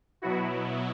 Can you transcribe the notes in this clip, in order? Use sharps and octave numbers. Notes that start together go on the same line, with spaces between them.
B2 F#3 B3 E4 F#4